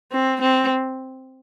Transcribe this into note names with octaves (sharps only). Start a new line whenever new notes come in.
C4
C4